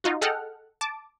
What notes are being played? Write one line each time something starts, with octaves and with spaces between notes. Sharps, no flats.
D#4 F4 F#4
G#4 A4 D#5 F#5 G5 F6
A5 D6